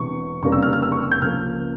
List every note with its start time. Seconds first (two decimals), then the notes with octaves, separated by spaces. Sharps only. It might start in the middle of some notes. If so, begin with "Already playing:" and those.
Already playing: E1 E2 C3 E3 C#6
0.42 F1 F2 C#3 G3 A#3 C#6
0.52 E6
0.62 F6
0.73 F6
0.82 E6
0.92 C#6
1.02 E6
1.11 G6
1.22 C#2 C#3 F3 A#3 F6